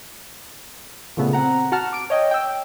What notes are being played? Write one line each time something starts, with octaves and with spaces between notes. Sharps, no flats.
A#2 C#3 A3 B3
C4 F#5 A#5
F#4 F#5 A5 A#5 F6
D6 D7
C#5 D#5 G5
G5 E6